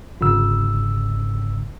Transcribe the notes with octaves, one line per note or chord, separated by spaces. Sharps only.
G1 G#2 C#3 E6